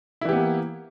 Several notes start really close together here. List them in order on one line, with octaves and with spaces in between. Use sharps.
E4 E3 G4 B3 A#3